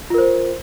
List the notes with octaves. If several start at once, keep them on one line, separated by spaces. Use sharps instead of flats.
F4 A#4 C5